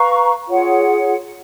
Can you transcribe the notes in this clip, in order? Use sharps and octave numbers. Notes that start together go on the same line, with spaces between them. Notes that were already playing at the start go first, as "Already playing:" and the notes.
Already playing: B4 F5 A#5 C#6
F4 G#4 C#5 F#5